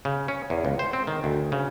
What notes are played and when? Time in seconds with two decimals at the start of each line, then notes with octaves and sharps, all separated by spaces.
0.05 C#3
0.28 C#4
0.50 E2
0.65 C#2
0.79 C5
0.93 C4
1.07 D#3
1.24 D2
1.52 C#3